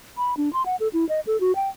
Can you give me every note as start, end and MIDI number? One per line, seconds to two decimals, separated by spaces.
0.17 0.34 83
0.37 0.52 62
0.53 0.65 84
0.66 0.76 78
0.80 0.88 69
0.93 1.07 64
1.09 1.20 75
1.27 1.39 69
1.40 1.55 66
1.56 1.69 79